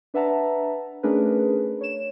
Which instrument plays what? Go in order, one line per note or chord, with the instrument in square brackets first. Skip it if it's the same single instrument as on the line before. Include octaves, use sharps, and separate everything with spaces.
[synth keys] D4 B4 E5 F#5 A5 A#5
A3 C#4 D4 G#4 A#4 B4
C#5 E7